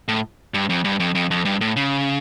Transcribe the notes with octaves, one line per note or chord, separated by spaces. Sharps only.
A2
G2
F2
G2
F2
F2
F2
G2
A2
C#3